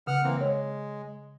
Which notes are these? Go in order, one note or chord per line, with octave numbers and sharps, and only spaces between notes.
C#3 F#5 F6
E3 A#3 C4
G#3 C#5